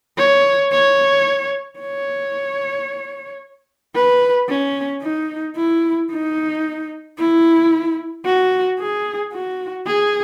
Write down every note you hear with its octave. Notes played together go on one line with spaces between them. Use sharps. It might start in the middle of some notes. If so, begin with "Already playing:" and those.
C#5
C#5
C#5
B4
C#4
D#4
E4
D#4
E4
F#4
G#4
F#4
G#4